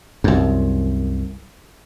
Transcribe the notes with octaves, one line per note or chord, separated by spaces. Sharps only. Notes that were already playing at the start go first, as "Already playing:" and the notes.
C2 F#2